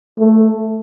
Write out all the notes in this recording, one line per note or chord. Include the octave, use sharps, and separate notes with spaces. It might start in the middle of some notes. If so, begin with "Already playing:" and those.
A3